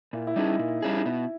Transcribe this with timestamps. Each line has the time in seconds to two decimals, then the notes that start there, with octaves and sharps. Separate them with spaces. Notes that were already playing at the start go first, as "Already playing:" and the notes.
0.13 A#2 E4
0.27 E4
0.36 G3 C#4 D#4 G#4
0.59 A#2
0.82 G3 C#4 G#4
0.98 D#4
1.05 B2 E4